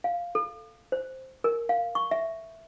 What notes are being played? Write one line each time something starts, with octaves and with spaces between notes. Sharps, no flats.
F5
A4
C5
A#4
F5
C#6
E5